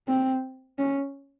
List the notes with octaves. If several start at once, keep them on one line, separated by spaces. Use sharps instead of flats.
C4
C#4